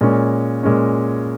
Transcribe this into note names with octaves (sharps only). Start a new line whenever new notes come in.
A#2 G#3 C#4
A#2 G#3 C#4